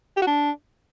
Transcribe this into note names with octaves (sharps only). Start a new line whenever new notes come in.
G4
F#4
D4